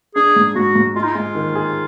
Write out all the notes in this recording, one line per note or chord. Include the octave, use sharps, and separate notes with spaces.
D4 G#4
G#2
G#2 F#4
G#2
G#3 F4
D#4
G#3 F4
D#3
G#4